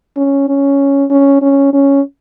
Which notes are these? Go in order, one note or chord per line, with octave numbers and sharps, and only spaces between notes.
C#4
C#4
C#4
C#4
C#4